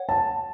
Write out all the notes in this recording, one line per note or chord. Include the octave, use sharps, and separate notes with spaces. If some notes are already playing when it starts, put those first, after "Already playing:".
Already playing: C#5 F#5
A5